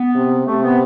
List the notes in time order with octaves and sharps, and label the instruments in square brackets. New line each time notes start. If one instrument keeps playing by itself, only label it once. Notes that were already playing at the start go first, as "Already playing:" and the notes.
Already playing: [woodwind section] B3
[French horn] C3
[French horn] C3 [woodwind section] A3
[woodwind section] B3